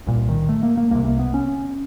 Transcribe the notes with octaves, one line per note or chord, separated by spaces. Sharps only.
C2 A#2
D#3
A3
A#3
A#3
C2 C3 A#3
A#3
B3
C#4